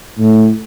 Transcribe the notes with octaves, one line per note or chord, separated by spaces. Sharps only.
A2